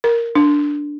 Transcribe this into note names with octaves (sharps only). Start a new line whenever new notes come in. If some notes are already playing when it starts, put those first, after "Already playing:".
A#4
D4